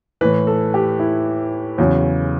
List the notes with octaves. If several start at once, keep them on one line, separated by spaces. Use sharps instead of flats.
A2 E3 B4
A4
G4
E4
E2 C#3 F#3